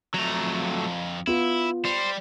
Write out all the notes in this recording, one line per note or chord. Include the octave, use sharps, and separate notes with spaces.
F2 F#3 A3 A#5
B3 E4 F4
G3 C5